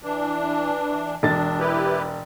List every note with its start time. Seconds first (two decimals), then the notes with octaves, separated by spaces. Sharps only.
0.03 E3 D4
1.23 E1 D4 A6
1.59 E4 G4 B4